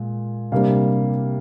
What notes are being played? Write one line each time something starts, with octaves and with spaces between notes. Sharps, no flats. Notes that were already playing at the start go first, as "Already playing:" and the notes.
Already playing: A#2 G#3
C3 G3 A#3 D4 F5